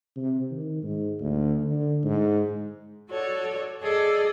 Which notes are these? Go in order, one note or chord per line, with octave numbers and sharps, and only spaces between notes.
C3
D#3
G#2
D2
D3
G#2
F#4 A4 C#5 D5
G#4 A4 D5 D#5